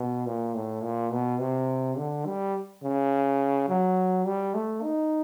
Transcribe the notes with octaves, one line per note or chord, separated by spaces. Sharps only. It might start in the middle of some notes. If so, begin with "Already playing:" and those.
Already playing: B2
A#2
A2
A#2
B2
C3
D3
G3
C#3
F#3
G3
A3
D#4